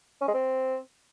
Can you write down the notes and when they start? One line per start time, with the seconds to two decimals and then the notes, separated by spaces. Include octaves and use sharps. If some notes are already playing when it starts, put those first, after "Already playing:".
0.21 C#4
0.28 G#3
0.34 C4